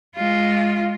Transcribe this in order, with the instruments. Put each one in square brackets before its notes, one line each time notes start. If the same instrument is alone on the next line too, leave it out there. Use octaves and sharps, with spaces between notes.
[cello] G#3 F4